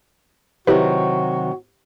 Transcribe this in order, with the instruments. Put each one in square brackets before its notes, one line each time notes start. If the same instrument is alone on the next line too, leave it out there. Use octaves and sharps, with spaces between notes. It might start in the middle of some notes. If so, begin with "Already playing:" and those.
[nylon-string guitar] C3 D#3 F#3 [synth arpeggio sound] E4 G4 B4 [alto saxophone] F#4